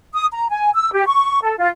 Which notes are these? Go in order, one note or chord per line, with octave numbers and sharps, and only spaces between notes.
D#6
A#5
G#5
E6
G4
C#6
A4
F4